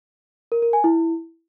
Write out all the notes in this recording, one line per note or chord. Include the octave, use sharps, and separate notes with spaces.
A#4
A#4
G#5
E4